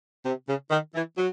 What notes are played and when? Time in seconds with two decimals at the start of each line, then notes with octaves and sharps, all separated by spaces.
0.24 C3
0.47 C#3
0.70 D#3
0.94 E3
1.17 F#3